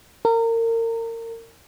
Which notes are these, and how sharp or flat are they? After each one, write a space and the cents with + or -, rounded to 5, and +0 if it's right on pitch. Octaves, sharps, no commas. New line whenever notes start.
A#4 -30